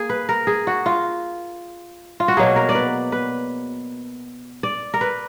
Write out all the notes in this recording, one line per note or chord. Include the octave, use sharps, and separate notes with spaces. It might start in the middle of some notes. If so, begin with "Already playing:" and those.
Already playing: A#3 G#4
B4
A#4
G#4
F#4
F4
F4
F#4
B2 F#3 A#3 G#4
A#4
D5
B4
B4
D5
A#4
B4